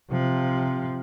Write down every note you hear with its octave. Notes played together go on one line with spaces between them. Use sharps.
C3 F3